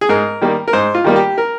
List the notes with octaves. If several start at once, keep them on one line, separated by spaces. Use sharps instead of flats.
G#4
G#2 A#4
D#3 G3 A#3
A#4
G#2 C5
F4
D#3 G3 A#3
G4
A#4